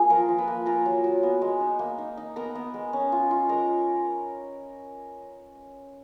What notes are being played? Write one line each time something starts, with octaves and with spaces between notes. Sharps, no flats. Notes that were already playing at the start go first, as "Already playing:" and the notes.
Already playing: A#3 F4 G#4 G#5
F3 A#4 A#5
F3
B4 B5
A#3
F4 A#4 A#5
F#3
F#3
B3
G#3
D#4
A#3
D#4
D#4
B3 A#4 A#5
B3
G#3
C#4
F4
F4
G#3 A#4 A#5